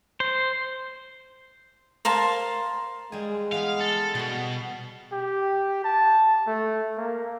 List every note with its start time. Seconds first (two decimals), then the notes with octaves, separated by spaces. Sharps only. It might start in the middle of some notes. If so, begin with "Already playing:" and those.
0.20 C5
2.05 A#4 C5 F5 A5
3.12 G3 G#3 G#4
3.52 E3 B3 F5
3.81 A4
4.15 B2 G3 F#5
5.12 G4
5.84 A5
6.47 A3
6.98 A#3